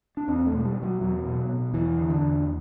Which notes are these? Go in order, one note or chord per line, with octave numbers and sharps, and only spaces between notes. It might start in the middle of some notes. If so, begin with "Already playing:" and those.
D4
E2 C4
A3
B2
A3
G3
B2
F#3
E2 F#3
B2
B2
E2 E3
D3
D3
E2